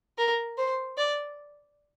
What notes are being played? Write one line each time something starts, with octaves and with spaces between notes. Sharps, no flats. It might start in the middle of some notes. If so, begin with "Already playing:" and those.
A#4
C5
D5